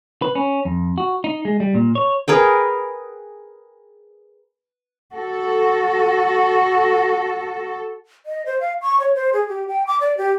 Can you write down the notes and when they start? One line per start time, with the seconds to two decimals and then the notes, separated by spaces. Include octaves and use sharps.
0.22 B4
0.35 C#4
0.65 F2
0.98 F#4
1.24 D#4
1.45 G#3
1.60 G3
1.75 A#2
1.95 C#5
2.28 G#4 A#4 B4 G5
5.15 F#4 A4
8.26 D#5
8.46 C5
8.60 F5
8.82 C#6
9.00 C#5
9.15 C5
9.33 G#4
9.48 G4
9.68 G5
9.87 D6
10.00 D5
10.17 G4